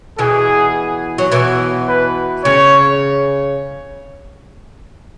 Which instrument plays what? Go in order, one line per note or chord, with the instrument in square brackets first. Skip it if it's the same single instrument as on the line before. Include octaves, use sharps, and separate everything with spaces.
[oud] B2 E3 [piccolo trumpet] G#4
[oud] F#3
B2 E3
[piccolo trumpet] B4
[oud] C#3 [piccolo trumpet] C#5